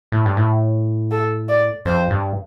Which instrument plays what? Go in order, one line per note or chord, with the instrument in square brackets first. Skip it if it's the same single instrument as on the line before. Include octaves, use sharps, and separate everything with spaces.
[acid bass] A2
G2
A2
[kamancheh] A4
D5
[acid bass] F2 [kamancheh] C5
[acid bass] G2